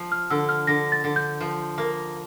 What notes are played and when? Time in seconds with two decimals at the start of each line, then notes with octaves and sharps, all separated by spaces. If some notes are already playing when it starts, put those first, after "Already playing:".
Already playing: F3
0.12 F6
0.30 D3 E6
0.49 F6
0.67 D3 A#6
0.92 A6
1.04 D3
1.16 G6
1.41 F3
1.78 A#3